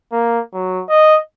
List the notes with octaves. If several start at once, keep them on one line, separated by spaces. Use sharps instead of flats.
A#3
F#3
D#5